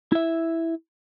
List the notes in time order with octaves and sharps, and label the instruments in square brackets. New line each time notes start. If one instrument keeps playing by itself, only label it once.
[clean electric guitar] E4 E5